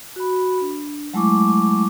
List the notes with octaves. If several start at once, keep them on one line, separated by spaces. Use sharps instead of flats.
F#4 B5
D4
F#3 G#3 A3 E4 C#6 D6